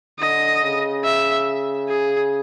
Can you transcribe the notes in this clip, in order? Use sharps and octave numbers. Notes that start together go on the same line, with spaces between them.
D3 D#5
C#3
E5
G#4